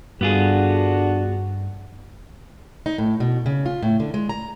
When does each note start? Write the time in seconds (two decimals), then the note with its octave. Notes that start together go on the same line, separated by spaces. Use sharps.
0.21 G2 D3 G3 B3 D4 F4 F#4 G#4
2.86 D#4
2.98 A2
3.20 B2
3.46 C#3
3.66 F4
3.83 A2
4.00 D3
4.14 G#3
4.29 A#5